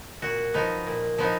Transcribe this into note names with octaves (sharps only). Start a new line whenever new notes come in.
A#2 F#4
F3 B3 D#4
A#2
F3 B3 D#4